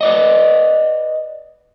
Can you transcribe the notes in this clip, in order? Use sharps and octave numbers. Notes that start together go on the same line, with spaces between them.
B4 D5 D#5